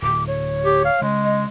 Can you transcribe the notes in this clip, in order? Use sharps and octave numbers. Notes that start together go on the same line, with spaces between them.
D1 D6
C#5
G4
F5
C#3 G#3
D#5